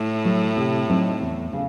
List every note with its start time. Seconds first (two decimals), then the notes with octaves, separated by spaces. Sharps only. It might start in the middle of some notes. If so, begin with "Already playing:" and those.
Already playing: A2
0.25 F#3 A3
0.57 C3
0.89 F#3 C4 D#4
1.21 E2
1.53 C#3